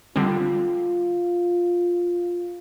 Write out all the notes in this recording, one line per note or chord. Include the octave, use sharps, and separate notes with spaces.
D3 G3 C4 F4